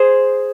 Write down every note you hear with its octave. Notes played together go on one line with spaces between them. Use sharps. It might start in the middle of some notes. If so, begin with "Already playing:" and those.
Already playing: G#4 C5